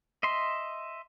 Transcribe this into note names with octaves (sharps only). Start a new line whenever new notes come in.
D#5 E5 C6